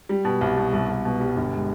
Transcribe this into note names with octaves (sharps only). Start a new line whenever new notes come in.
G3
B2
C2
B2
C2
C2
B2
G3
G1
G#3